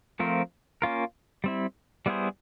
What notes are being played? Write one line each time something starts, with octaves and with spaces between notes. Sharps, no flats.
F3 A3 C4 F4 A#4
A#3 C#4 F4 A#4
G3 C4 E4
G3 B3 E4 G#4 C5